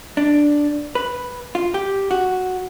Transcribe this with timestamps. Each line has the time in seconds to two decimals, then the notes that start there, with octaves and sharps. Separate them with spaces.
0.17 D4
0.95 B4
1.55 F4
1.74 G4
2.11 F#4